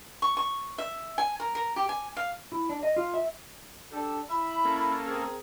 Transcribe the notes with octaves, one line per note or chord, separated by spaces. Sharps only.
C#6
C#6
E5
G#5
A#4
A#4
G4
G#5
F5
E4
D4
D#5
F4
E5
D4 G4 A4
E4 E5 B5
A#3 C#4 A4
C4 G#4 A#4